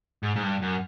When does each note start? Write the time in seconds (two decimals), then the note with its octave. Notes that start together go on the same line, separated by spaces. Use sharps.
0.23 G#2
0.36 G#2
0.43 G2
0.62 F#2